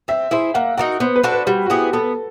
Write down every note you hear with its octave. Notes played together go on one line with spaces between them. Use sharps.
C4 E5
E4 G#4 C5 E5
A#3 F#5
D#4 F#4 A#4 F#5
B3 C5
B4
D4 F#4 A4
B4
G3 F#4
F#4
B3 E4 G4 G#4
B3 A4